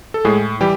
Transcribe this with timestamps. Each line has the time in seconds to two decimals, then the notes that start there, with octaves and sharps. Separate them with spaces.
0.14 A4
0.25 A2 G#3 G#4
0.61 E3 G3 G4